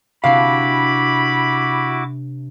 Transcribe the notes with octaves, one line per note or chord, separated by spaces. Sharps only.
C3 C4 D4 E4 F#4 F5 B5 D6